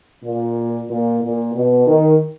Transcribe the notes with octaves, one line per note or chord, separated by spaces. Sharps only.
A#2
A#2
A#2
B2
D#3